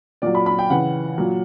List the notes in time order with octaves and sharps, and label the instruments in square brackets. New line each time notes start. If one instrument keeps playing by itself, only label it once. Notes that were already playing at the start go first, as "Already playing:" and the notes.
[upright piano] A#2 F#3 D5
B5
B5
G5
C#3 E3 F#5
A#2 F#3